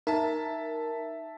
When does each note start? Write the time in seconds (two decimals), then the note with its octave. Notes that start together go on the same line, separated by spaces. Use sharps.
0.07 D#4 A#4 E5 A5